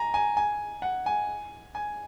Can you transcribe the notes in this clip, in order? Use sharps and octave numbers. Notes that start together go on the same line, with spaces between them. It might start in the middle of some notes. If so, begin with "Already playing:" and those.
Already playing: G#5 A#5
G#5
G#5
F#5
G#5
G#5